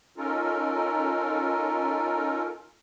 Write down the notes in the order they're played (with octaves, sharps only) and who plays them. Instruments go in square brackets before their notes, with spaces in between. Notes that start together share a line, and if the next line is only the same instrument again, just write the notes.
[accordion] C#4 D#4 F4 A4 A#4